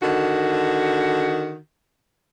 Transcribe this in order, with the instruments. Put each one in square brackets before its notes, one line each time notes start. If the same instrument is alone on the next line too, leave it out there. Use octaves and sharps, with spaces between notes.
[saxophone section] D3 D#3 F#4